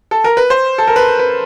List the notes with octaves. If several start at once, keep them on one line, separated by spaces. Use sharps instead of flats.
A4
A#4
B4
C5
A4
A#4
B4
B4